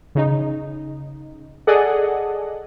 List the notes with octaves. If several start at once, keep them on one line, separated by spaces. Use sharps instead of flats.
C#3 D#4
G#4 A4 D5 D#5 F#5